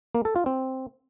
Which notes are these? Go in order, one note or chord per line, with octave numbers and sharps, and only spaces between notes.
A#3
A4
F4
C4